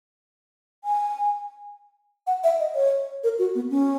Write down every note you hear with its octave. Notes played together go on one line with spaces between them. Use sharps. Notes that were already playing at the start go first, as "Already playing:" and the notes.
G#5
F#5
E5
D#5
C#5
A#4
F#4
B3
C#4